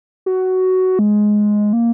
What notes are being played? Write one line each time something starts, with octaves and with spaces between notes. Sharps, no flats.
F#4
G#3
A#3